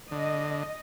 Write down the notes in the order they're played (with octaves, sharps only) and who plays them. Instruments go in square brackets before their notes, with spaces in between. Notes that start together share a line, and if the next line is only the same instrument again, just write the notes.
[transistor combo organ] D3 [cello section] D#5